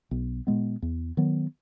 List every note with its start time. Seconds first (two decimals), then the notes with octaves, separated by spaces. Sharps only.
0.11 B1
0.47 A#2 G#3 B3
0.82 E2
1.17 D#3 F#3 B3